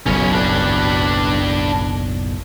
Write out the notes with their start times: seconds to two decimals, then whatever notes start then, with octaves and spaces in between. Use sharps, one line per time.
0.06 F#1 B1 A2 C#4 E4
0.32 D4 B4